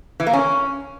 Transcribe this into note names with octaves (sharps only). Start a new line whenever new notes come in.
E3
A#3
C#4